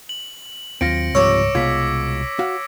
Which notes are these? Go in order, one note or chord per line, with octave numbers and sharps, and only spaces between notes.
F#7
D#2 F#3 C4 F4 A#6 C#7 D7
C#2 G#2 C3 F3 G3 C#5 D6 E6
C2 B2 G#3 F4 G#6 B6
F#4 F5